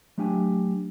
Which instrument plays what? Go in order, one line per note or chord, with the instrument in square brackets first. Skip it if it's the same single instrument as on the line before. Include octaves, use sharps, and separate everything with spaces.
[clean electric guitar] F#3 A3 D4 G4 G5 G#5